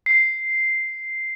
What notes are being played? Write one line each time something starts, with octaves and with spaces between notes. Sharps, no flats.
C7